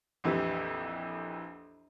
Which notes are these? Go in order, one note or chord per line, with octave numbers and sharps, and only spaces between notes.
A#1 F2 E3 G4